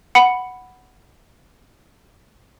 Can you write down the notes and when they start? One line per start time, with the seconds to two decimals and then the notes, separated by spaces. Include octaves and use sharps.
0.15 F#5 B5 C#7